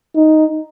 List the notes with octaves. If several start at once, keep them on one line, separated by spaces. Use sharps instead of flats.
D#4